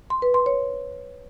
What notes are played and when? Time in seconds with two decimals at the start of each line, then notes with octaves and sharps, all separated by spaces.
0.10 C6
0.22 B4
0.34 C6
0.46 C#5